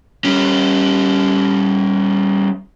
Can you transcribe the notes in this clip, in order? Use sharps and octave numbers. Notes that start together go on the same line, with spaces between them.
G3 C#4